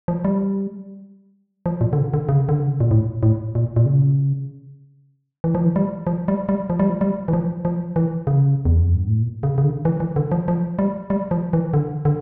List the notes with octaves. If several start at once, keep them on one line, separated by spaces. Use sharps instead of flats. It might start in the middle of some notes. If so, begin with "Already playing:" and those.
F3
G3
F3
A#2
D3
C#3
D3
C#3
D3
C#3
A#2
A2
A2
A#2
A#2
C#3
E3
F3
E3
G3
F3
G3
G3
F3
G3
F3
G3
E3
F3
F3
E3
C#3
E2
F2
G2
A2
A#2
C#3
C#3
D3
E3
E3
D3
F3
F3
G3
G3
F3
E3
D3
D3